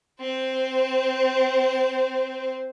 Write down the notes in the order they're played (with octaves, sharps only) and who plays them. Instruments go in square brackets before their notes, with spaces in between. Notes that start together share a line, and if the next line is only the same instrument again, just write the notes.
[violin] C4 C5